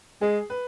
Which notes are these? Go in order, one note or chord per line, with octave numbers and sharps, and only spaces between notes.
G#3 G#4
B4